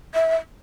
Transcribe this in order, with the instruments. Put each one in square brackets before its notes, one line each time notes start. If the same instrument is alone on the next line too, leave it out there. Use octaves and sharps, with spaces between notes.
[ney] E5